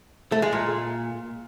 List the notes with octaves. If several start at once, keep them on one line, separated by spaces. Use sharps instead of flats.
A3
G#3
A#2